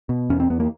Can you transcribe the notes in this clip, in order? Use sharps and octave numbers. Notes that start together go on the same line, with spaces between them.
B2
E2 C#4
C4
E2 B3
A#3